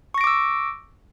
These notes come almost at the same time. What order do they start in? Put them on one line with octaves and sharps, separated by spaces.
C#6 A#6 D7 D6 E6